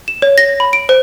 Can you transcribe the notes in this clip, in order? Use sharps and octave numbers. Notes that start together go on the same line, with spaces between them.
E7
C#5
A#6
B5
D7
C5